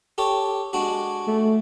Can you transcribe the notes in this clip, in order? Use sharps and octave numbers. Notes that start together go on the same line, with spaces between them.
G4 A4 C#5
G#3 D4 F#4
A3